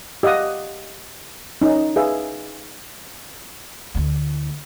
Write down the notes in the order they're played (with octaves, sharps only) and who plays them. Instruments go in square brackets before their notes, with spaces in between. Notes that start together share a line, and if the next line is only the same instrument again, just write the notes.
[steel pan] G4 D#5 F5 F#5 D#6
C#4 D#4
G#4 B4 E5 F5
[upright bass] D2 E4